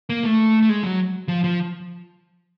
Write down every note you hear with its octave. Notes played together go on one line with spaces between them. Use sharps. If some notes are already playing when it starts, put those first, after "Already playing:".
A#3
A3
A3
G#3
F#3
F3
F3